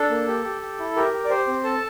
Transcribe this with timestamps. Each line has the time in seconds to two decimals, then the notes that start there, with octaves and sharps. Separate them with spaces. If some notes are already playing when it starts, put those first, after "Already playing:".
Already playing: D4 A4
0.10 A#3
0.28 G4
0.44 G4
0.62 G4
0.79 E4
0.96 G4 A#4
1.13 G4
1.25 D5
1.29 G4 C5
1.47 C4
1.64 A4 A5